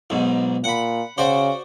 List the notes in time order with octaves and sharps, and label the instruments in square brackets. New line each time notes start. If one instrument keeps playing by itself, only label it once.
[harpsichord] B1 G#2
[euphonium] A#2 [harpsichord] F#5 B5
[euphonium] C#3 [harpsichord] F#4 C5 D5